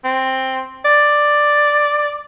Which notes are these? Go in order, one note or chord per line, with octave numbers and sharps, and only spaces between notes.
C4
D5